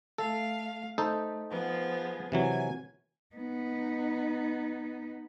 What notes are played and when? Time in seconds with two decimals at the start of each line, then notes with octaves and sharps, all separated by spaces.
0.18 A3 A4 F5
0.98 A3 D#4 A4 C5
1.51 F3 B3 G#4
2.32 C3 E3 F#3 G#5
3.36 B3 D#4